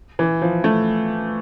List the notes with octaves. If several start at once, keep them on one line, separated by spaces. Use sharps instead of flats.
E3
F3
A3